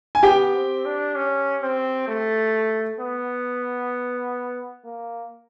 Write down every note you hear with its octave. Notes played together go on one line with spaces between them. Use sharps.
G#5
B3 G4 G5
C4
D4
C#4
C4
A3
B3
A#3